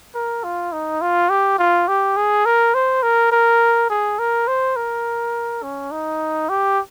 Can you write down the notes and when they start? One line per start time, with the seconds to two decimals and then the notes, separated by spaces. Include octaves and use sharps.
0.15 A#4
0.44 F4
0.72 D#4
1.01 F4
1.30 G4
1.59 F4
1.88 G4
2.17 G#4
2.45 A#4
2.74 C5
3.03 A#4
3.32 A#4
3.90 G#4
4.19 A#4
4.48 C5
4.76 A#4
5.63 C#4
5.92 D#4
6.49 G4